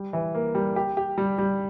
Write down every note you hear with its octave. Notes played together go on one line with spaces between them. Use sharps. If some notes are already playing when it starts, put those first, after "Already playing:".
Already playing: G3
E3
A#3
G3
G4
G4
G3
G3